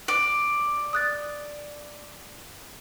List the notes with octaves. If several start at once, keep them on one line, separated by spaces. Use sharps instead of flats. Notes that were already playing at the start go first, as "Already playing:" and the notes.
D5
D#6 F#6 A6